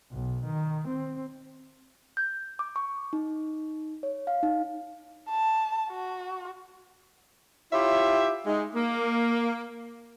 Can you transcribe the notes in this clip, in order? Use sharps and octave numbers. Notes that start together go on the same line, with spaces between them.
B1
D#3
C4
G6
D6
C#6
D#4
C#5
F5
D#4
A5
F#4
E4 F4 G4 C#5 E5
G#3 D#4
A#3